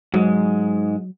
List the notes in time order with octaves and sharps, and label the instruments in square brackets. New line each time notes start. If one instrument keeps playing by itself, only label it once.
[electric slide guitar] G#2 G#3 [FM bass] F#3